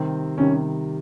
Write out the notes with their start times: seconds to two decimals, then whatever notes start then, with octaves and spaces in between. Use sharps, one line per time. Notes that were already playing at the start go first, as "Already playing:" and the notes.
Already playing: C3 D#3 G3 C4
0.38 C3 D#3 G3 C#4